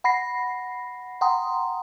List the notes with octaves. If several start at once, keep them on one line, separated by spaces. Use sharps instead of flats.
F#5 B5 A#6 C7
F#5 G5 A#5 C6 D#6